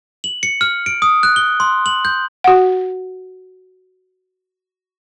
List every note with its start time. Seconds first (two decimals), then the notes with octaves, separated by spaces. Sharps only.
0.24 F#7
0.43 C#7
0.61 F6
0.86 D7
1.02 D#6
1.23 F#6
1.36 G7
1.60 C6
1.86 F#7
2.05 G6
2.44 F#4 F#5